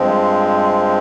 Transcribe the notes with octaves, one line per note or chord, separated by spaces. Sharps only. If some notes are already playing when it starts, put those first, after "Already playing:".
Already playing: G2 F3 G#3 C4